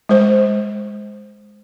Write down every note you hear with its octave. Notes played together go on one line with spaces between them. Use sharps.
G#3 C5